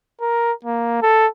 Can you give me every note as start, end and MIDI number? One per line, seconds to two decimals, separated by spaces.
0.21 0.52 70
0.65 0.97 58
1.02 1.27 69